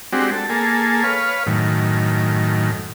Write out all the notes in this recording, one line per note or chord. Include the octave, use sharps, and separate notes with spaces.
G#3 C4 D4 F#4 G4
A4
A#3 G#4 A4
B4 C#5 F5
F#2 A2 D#3